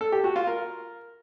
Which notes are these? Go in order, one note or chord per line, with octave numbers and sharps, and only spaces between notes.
A4
G4
F#4
F4
A#4